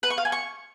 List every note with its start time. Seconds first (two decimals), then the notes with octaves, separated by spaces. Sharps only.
0.03 B4
0.10 C#6
0.18 F5
0.25 G#5
0.32 C#6